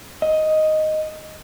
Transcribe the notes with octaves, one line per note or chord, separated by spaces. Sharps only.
D#5